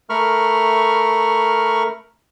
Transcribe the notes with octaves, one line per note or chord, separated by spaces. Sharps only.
A3 A#4 B5 C#6 F6